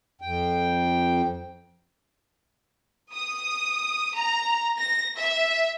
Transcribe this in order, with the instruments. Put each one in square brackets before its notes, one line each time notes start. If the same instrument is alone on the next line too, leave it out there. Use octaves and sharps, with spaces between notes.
[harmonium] F2 G5
[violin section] D#6
A#5
A#6
E5